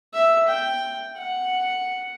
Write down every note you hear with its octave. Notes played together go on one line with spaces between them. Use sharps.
E5
G5
F#5